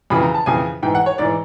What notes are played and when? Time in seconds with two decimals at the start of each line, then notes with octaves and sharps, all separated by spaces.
0.10 F2 C#3 E3 B5
0.23 A#5
0.34 A5
0.46 F2 C#3 E3 G#5
0.83 G#2 E3 G5
0.95 F#5
1.06 C#5
1.18 G#2 E3 D5